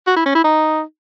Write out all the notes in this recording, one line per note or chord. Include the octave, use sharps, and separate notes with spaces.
F#4
E4
C#4
E4
D#4